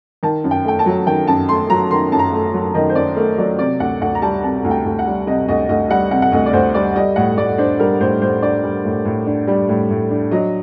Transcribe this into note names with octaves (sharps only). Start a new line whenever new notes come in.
D#3 A5
F#2
G5
A3 G5
A5
F#3
D#3 G5
F#2 A5
A3 C6
F#3 A#5
D#3 C6
F#2 A5
A#5
A3
F#3
D#3 D#5
C5
F#2 D5
A3 A#4
F#3 D5
C3 D5
D2 F#5
D2 F#5
A#5
G3 A5
C3 A5
D2
G5
D2
F#5
G3
C3 D#5
D2 D#5
D2 D#5
G3 F#5
C3 F#5
F#5
D2 D#5
D5
D2 C5
G3 D5
G3 D#5
A2 F#5
A2 D5
D4 C5
G3 A#4
A2 C5
A2 C5
D4 D5
G3
A2
A2
D4
G3
A2
A2
D4
F#3 D#5